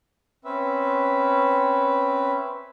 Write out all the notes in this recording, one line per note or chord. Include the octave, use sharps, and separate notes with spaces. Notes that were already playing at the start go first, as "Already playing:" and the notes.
C4 C#4 B4 E5